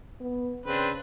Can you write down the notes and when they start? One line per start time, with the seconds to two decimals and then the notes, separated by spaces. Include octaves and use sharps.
0.20 B3
0.66 C#3 C4 D4 B4